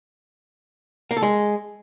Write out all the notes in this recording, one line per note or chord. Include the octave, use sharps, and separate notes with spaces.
A#3
A4
G#3